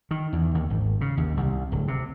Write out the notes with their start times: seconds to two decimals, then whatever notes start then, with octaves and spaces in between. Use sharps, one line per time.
0.11 D#3
0.33 E2
0.55 D#2
0.70 G#1
1.01 C#3
1.17 D#2
1.37 C2
1.72 D1
1.88 C3